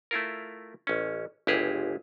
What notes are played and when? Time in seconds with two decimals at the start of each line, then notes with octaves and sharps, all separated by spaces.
0.11 A3 E4 F4 A#4
0.87 A1 C#4
1.47 G1 C#2 E4 G4 G#4